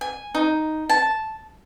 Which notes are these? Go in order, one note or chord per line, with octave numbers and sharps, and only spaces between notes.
G#5
D#4
A5